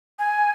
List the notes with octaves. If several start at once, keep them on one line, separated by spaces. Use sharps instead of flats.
G#5